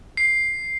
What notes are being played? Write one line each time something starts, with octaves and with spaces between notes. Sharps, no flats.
C7